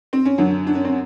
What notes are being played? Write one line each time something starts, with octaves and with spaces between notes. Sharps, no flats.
C4
C#4
F#2 D3 F#3 D4
D4
C#4
C4